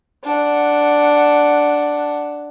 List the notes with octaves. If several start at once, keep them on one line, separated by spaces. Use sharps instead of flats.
D4 F#5